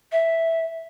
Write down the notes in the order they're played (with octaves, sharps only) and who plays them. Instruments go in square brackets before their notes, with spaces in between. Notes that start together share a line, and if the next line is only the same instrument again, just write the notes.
[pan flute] E5